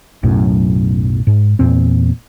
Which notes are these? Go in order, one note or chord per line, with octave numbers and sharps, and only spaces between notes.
B1 F#2 A2
G#2
E2 A#2 C4